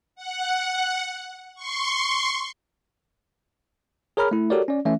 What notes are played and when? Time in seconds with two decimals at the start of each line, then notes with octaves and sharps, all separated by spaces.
0.15 F#5
1.55 C6 C#6
4.17 G#4 A#4 C#5 A#5 B5 F6
4.31 A3 E4
4.50 F#4 G4 A4 A#4 C#5 D5
4.68 C#4 D5
4.85 E3 A3 C#4 E5